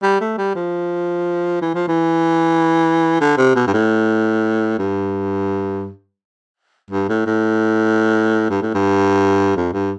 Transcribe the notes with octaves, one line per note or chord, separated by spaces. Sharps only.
G3
A3
G3
F3
E3
F3
E3
D3
C3
B2
G2
A2
G2
G2
A2
A2
G2
A2
G2
F2
G2